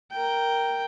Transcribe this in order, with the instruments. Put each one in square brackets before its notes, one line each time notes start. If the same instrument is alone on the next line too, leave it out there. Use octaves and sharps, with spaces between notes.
[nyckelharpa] A#4 G5